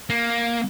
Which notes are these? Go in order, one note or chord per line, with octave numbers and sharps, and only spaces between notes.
A#3